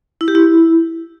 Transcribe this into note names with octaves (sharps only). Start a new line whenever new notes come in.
E4
G4
E4